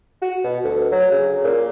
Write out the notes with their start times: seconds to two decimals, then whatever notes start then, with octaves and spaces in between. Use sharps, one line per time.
0.22 F#4
0.44 B2
0.64 D2
0.92 F#3
1.11 C#3
1.44 A#2